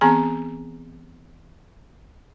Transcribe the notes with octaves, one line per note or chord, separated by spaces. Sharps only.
E3 B3 C4 G#4 G#5 A#5